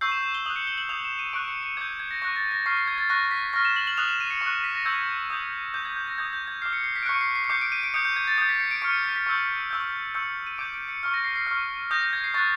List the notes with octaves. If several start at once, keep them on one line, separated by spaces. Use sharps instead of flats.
C#6 E6 G6 C7
E7
E7
G7
D#6 F#6 F#7
C#7
G7
F#7
D#6 G6 F7
E7
D#7
C#6 F#6 D7
C#7
C#7
D6 G6 G#6
G6
G#6
A#6
C#6 F#6 A#6
A6
A#6
C#6 F6 C7
C7
G#6
A6
C#6 F#6 A#6
B6
C#6 F6 A#6
E7
F#7
F#7
D#6 F#6 F7
E7
D#7
C#7
C#6
F#6
B6
A#6
C#6 E6 G6 G#6
D#6 G6
D6 G6
G#6
G6
A#6
D#6 G6 G#6
G6
G#6
D6 F6 C7
C#7
C7
B6
D7
C#6 F#6 C#7
C7
C7
C#7
D6 G6 C7
D7
D#7
D7
D#6 G6 C#7
G6
G#6
A6
D#6 G6 A6
B6
C#7
D7
C#6 F6 C#7
B6
B6
C#6 E6 G6
C#6 E6 G6
C#6 E6 G6 C#7
D#7
D6 G6 D7
D7
C#7
C#6 F6
A#6
C7
C7
C#6 F6
D#6 G6 A#6
G6
G#6
C7
C#6 F#6 A6